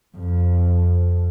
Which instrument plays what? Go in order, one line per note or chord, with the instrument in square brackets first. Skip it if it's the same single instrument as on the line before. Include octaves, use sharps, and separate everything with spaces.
[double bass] F2